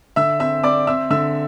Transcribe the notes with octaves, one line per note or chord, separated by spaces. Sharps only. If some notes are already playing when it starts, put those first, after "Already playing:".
D3 E5 E6
C4 E5 E6
C4 D5 D6
C4 E5 E6
D3 E5 E6